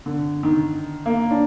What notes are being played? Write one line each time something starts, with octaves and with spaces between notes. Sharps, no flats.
D3
D#3
A#3
D4